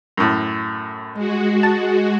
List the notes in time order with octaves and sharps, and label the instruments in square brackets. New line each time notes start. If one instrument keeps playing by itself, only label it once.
[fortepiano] F#2 A2
[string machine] G#3 F#4
[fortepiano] A5